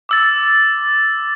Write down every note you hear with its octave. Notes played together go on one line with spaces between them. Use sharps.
D6 E6 A6